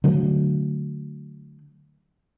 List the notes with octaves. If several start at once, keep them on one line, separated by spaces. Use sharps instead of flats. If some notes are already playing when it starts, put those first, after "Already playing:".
D3 F#3 A3